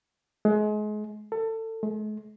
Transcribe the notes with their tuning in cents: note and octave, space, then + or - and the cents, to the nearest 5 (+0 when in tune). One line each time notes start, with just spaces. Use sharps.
G#3 +30
A4 +25
G#3 +45